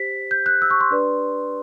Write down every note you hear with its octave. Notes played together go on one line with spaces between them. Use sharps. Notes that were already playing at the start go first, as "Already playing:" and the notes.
Already playing: G4 C5 B6
G6
F#6
E6
C#6
C6
D4 G4 B4 D5